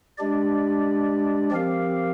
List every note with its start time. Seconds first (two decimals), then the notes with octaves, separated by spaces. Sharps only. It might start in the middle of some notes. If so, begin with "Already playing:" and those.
0.18 G#3 D4 G4 D5
1.51 F3 C4 G4 A#4 F5